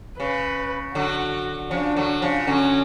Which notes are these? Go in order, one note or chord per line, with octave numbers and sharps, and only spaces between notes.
C#3 B4
D3 F#3 F#4
C#3 F3 D4
D3 F#3
C#3 F3
D3 F#3 C#4